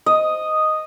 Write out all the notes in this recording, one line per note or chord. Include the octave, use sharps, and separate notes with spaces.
D#5